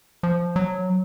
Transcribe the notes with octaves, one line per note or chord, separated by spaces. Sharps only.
F3
F#3